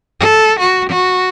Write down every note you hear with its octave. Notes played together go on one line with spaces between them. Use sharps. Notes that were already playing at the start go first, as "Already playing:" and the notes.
A4
F#4
F#4